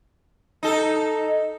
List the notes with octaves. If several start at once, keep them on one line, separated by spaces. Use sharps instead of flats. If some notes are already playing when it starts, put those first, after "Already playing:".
D#4 A4